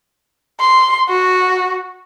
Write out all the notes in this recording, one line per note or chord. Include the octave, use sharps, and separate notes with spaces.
C6
F#4